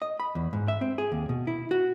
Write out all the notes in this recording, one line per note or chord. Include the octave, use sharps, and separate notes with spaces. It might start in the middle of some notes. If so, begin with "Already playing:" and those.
D#5
B5
E2
G#2
E5
C4
G#4
D#2
B2
E4
F#4